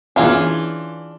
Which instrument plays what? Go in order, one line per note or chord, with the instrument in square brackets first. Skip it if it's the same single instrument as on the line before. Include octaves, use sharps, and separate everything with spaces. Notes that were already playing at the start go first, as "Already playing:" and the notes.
[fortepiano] E3 C#4 [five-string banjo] D4 F4 G#4